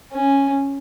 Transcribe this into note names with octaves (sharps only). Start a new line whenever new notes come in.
C#4